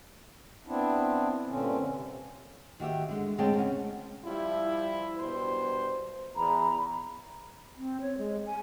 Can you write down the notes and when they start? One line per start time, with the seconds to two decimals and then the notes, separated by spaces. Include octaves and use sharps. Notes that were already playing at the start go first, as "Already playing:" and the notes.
0.67 B3 C4 D4 E4
1.47 G2 A#2 D3 C4 C#4
1.89 C3
2.80 D#3 F#4 G4 E5
3.09 D3 G#3
3.38 D2 G#3 C4 C#5 G5 A5
3.57 C#3 C#4 F#5
4.25 F3 G3 E4
5.18 G2 B2 C5
6.36 E2 A#5 B5
7.77 C4
8.01 C#5
8.18 G#3
8.46 G#5